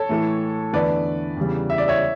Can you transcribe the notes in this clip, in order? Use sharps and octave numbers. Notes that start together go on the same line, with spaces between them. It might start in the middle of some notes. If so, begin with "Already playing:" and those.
Already playing: A4 C#5
A2 E3 A3
E2 D3 A3 D4 B4 D5
E2 C#3 G3
E5
D5
C#5 E5